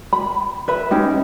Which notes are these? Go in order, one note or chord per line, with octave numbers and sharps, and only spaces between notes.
B5
B4 E5 B5
C#4 D#4 G4